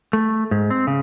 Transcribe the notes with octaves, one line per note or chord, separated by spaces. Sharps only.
A3
G#2
C4
C#3